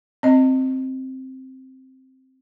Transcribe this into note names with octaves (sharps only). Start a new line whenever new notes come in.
C4 D#5